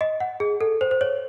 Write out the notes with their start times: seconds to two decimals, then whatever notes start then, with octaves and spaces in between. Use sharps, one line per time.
0.01 D#5
0.20 F#5
0.40 G#4
0.61 A4
0.81 C5
0.91 C5
1.01 C#5